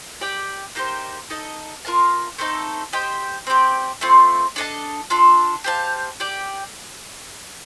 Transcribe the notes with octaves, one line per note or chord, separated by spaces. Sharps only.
G4 D5 G5
A#3 D#4 G4 C5
D#4 A4 D#5
F4 A#4 F5 A5
A3 C4 D#4 A4
G4 C5 D#5 G5
C4 G4 D5
A3 C4 F4
D4 A4 D#5 A5
D4 F4 A4
G4 C5 F5 A5
G4 D5 G5